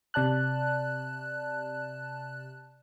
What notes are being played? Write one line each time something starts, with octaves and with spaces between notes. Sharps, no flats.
C3 D5 A5 F#6